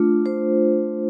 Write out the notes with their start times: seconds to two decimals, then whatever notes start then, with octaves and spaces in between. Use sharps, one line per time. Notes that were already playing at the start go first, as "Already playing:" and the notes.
Already playing: A3 D4 F4
0.26 C5